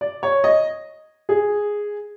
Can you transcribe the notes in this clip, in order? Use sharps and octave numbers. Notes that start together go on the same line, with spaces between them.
D5
C#5
D#5
G#4